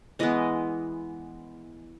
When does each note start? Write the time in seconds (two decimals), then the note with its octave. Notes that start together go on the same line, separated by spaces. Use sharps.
0.19 E3 G#3 B3 D#5